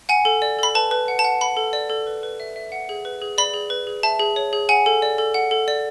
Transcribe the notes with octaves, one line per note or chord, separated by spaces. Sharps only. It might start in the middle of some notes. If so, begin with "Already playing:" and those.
F#5 G#5
A4
D5
A4 B5
B4 A5
B4
F#5
A5
F#5
F#5 B5
A4
D5
A4
B4
B4
E5
E5
F#5
G#4
B4
G#4
D5 B5
G#4
B4
G#4
E5 A5
G#4
C#5
G#4
F#5 G#5
A4
D5
A4
F#5
A4
D5